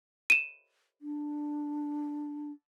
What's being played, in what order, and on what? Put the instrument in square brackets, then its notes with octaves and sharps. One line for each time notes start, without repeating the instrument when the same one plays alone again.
[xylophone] D#7 E7
[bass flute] D4